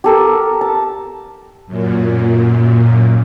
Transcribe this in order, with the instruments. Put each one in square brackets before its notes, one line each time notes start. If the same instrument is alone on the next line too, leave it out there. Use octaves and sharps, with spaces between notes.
[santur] G4 A4 A#4
A5
[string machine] F#2 A#2